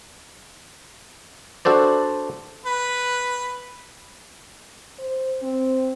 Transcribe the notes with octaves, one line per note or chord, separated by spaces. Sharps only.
D4 F#4 A4 C5 D5
B4
C5
C4